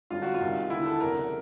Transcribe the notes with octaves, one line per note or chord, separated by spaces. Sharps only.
G#1 F#2 D3 G3 F4
F#4
F4
C2 C3 D#3
E1 D#2 D3 E4
A4
F#1 E2 C3 A#4